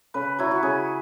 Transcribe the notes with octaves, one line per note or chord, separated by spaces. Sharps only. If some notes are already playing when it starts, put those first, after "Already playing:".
C#3 B4
F#3 E4
F#4
C#3 G#4